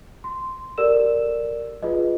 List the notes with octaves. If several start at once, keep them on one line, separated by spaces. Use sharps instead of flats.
C6
G4 A4 A#4 D5 E6 E7
F4 G#4 B4 D#5